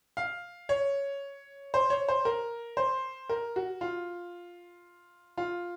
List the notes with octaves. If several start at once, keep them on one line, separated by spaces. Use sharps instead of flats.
F5
C#5
C5
C#5
C5
A#4
C5
A#4
F#4
F4
F4